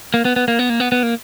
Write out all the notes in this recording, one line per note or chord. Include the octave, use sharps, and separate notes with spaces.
A#3
B3
B3
A#3
B3
A#3
B3
B3
A#3